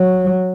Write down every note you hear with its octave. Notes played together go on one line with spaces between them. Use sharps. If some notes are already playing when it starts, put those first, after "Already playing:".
Already playing: F#3